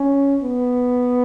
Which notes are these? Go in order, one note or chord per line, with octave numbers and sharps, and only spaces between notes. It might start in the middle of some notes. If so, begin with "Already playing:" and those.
Already playing: C#4
B3